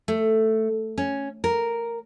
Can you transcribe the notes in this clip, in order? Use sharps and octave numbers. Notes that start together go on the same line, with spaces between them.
A3
C#4
A#4